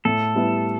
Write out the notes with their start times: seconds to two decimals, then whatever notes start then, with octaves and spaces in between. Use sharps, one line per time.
0.05 A2 A4
0.35 G3 B3 E4